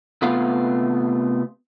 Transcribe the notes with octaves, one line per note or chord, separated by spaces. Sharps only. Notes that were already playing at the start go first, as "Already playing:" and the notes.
C3 A3 B3 F4 B4 F5